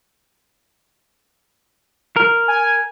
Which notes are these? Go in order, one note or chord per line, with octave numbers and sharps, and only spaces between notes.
A#4
G#5